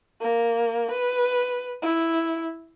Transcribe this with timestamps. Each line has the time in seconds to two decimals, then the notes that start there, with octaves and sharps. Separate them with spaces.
0.21 A#3
0.91 B4
1.82 E4